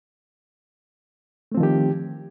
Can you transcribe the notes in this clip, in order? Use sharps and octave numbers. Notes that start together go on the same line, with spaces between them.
D#3 F3 A3 C4 G4